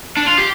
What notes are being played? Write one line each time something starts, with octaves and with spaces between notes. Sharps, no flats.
D4
F4
G4